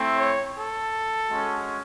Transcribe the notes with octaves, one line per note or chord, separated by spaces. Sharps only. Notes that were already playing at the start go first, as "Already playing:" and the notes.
Already playing: A3 C4 E4
C#5
A4
G#3 C#4 F#4